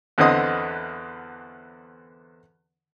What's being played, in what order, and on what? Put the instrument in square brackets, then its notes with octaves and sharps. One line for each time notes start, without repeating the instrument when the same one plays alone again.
[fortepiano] E2 D3 B3 C4 D#5 D#6